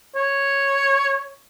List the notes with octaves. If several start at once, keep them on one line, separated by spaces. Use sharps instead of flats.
C#5